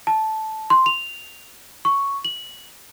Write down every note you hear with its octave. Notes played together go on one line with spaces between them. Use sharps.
A5
C6
F7
C#6
F#7